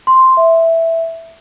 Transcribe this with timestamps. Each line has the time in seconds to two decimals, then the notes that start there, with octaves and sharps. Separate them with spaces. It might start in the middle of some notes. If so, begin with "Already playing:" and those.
0.07 C6
0.37 E5